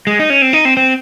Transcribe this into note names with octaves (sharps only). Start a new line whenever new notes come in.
G#3
D#4
C#4
C4
D#4
C4
C4